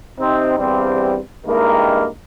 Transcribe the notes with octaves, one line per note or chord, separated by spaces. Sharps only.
C3 C4 D#4
E2 G2 G3 C4
G2 D#3 G#3 A#3 E4 A#4